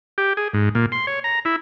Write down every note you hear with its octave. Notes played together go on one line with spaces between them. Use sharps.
G4
G#4
G#2
A#2
C6
C#5
A#5
E4